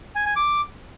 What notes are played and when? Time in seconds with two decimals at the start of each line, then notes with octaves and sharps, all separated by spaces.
0.16 G#5
0.26 G#5
0.36 D6